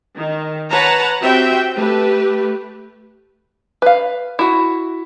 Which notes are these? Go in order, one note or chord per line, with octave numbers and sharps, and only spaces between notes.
D#3
B4 C#5 F#5 A5 A#5
C4 F#4 G4 E5 G5
A3 G4 B4
B4 F5
E4 F#4